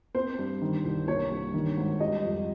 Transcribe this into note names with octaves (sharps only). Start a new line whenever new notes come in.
C4 C5
G2
D#3
C2
A#3 C#5
G2
D#3
G#1
G3 D#5
F2